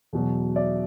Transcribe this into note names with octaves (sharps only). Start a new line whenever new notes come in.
E2 B2 F#3
D5 E5